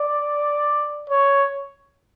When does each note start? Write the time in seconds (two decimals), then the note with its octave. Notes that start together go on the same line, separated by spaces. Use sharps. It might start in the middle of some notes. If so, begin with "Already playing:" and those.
Already playing: D5
1.10 C#5